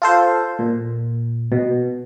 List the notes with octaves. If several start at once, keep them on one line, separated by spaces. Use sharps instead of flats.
F4 A4 C5
A#2
B2